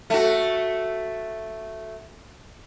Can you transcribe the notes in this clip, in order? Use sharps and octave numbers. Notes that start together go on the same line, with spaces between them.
A3 F#4